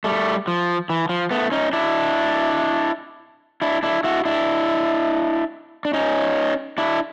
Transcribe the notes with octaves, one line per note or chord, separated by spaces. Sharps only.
G3 A3
F3
E3
F3
A3 B3
C#4 D#4
D4 E4
D4 E4
D4 E4
E4 F#4
D4 E4
D4
C#4 D#4
D4 E4